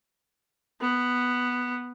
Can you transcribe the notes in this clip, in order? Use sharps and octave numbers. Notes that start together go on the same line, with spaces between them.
B3